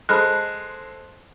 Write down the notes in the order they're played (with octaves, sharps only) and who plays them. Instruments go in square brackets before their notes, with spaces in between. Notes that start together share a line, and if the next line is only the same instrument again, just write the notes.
[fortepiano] G#3 [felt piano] A4 C5 [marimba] A5 B5 F6 [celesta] F#6